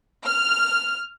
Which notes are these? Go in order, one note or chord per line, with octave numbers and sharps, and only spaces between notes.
F6